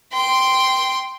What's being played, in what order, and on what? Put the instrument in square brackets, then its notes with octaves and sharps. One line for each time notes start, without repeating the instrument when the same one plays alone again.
[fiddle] G5 C6